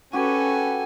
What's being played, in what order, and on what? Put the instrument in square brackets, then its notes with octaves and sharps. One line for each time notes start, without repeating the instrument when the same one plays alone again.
[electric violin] C#4 B4 [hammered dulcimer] F#4 G4 [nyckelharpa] A4 G#5